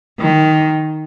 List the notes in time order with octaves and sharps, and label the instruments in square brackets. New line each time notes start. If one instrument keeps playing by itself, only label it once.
[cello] D#3